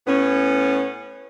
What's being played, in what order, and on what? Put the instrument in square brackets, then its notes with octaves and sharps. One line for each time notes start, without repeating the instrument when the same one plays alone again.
[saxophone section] A2 B3 C#4